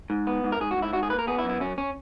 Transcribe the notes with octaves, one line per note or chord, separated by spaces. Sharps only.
G#2
B3
G#2
A#4
G#2 G#4
F#4
G#2
E4
G#2 F#4
G#4
A#3 B4
A#4
B3 G#4
E4
F#2
E4
F#2 C#4
C#4